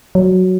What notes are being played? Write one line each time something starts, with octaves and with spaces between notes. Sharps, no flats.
F#3